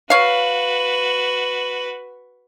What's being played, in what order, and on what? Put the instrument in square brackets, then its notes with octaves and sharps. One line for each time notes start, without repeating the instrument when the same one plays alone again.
[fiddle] F#4 B4 [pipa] C#5 F5